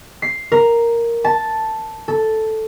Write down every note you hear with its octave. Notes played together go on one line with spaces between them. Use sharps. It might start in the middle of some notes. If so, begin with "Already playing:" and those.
C7
A#4
A5
A4